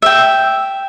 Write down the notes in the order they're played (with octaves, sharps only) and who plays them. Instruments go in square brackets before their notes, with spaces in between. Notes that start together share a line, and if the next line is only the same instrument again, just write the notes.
[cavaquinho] E5 G5